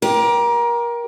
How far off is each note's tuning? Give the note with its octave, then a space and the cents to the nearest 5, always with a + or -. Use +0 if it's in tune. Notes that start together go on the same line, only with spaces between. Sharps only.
G4 +0 A#4 +25